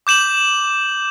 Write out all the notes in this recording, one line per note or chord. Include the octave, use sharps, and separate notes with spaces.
D6 G6 E7 F#7